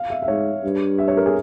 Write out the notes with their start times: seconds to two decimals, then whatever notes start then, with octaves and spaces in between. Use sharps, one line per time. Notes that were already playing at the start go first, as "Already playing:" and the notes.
Already playing: F5
0.10 E5
0.22 E5
0.28 G#2 C#5
0.64 G2
0.98 E5
1.08 C#5
1.17 A#4
1.26 G#4